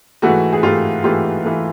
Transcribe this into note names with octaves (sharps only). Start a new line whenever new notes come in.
G#2 E3 A3 F#4
G#4
G#2 E3 A3 F4 G4
G#2 E3 A3 F4 G4
E3 A3